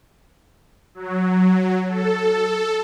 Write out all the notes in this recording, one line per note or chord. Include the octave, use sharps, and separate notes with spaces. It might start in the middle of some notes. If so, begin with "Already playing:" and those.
F#3
A4